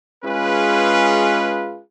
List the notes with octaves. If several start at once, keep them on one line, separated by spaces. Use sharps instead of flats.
G#3 C#4 F4 G#4 B4